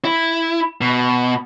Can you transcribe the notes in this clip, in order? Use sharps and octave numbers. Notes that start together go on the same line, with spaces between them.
E4
B2